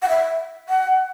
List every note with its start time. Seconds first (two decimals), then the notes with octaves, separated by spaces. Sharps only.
0.02 F#5
0.09 E5
0.69 F#5